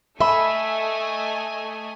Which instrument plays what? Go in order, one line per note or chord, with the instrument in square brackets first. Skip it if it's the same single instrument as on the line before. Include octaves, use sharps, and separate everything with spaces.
[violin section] A3 D#5 G#5 [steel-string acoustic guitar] E5 [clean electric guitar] B5